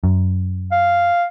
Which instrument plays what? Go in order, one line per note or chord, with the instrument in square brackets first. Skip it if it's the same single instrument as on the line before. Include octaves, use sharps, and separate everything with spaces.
[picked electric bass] F#2
[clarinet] F5